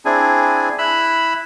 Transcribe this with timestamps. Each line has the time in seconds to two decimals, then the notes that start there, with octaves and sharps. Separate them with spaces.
0.05 C4 D4 E4 G#4 G#5
0.78 E4 B5 E6 F#6